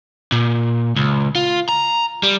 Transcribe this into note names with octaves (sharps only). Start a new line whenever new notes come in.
A#2
C#2
F4
A#5
G3